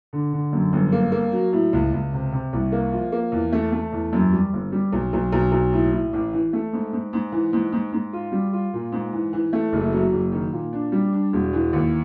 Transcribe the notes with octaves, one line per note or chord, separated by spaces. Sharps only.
D3
D3
F#2
G1
A#3
A#3
F#3
A2
C#2
C#2
C3
C3
C2
A#3
F3
A#3
E2
A3
A3
E2
F#2
G3
G1
G3
B1
B1
B1
B1
A2
A2
A1
E3
A3
G#2
G#2
G#2
E3
G#2
G#2
G#2
F4
G3
F4
A#2
G#2
E3
E3
A3
F#1
F#3
F#1
D#3
A#2
D4
G3
D4
E1
E3
D#2